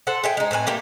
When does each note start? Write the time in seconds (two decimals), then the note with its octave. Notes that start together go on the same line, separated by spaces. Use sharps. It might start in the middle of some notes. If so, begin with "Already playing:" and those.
0.07 A4 C5 F#5
0.24 G#4 E5 G5
0.37 G#3 D#4
0.51 A2 C4 B4 G#5
0.67 A3 A#3 G4